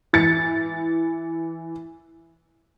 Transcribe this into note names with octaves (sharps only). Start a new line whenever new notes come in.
E3 A6 C#7